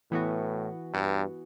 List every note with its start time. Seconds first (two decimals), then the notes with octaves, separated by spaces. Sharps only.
0.11 A2 E3 B3 F#4
0.94 G2